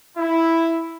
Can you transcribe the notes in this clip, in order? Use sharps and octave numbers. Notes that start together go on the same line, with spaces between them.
E4